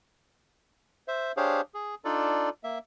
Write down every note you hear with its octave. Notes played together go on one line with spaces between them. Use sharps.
C5 E5
D4 G4 G#4 C5 C#5 F5
G#4
D4 D#4 F4 A4 D5
A#3 E5